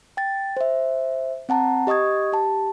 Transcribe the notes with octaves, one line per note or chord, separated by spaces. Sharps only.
G5 A6
C5 E5
C4 F#5 A5 A#5
G4 D#5 C#6 D#6 G#6
G4 A5